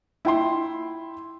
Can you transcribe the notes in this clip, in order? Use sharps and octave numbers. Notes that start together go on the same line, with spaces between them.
E4 G5 C6